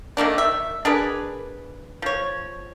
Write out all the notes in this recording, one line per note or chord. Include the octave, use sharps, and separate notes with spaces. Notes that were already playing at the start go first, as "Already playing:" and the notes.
D#3 A3 A#3 D4
E5
D4 G#4 A#4 B4
F3 C#5